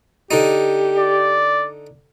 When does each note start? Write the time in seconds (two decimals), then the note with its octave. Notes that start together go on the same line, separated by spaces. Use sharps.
0.31 D3 D#4 G4
0.98 D5